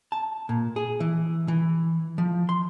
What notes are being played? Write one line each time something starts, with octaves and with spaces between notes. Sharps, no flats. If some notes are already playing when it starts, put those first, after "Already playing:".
A5
A#2
G#4
E3
E3
F3
C6